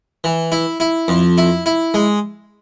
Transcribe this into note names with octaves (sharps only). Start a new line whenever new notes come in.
E3
E4
E4
F2
E4
E4
G#3